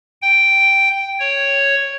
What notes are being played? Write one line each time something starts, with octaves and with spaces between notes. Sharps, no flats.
G5
C#5